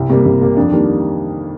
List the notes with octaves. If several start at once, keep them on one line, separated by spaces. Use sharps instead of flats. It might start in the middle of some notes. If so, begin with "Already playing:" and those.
Already playing: C2
C3 G3 A#3
C2
C3 G3 A#3
F2 D4
D#3 G3 A#3